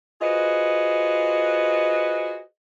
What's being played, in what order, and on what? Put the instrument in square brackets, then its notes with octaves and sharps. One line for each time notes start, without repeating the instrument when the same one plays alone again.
[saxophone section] F4 F#4 G#4 B4 C5 D#5